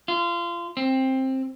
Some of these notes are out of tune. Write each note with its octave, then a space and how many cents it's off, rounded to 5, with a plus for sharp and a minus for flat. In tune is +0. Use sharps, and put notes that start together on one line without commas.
F4 -25
C4 +15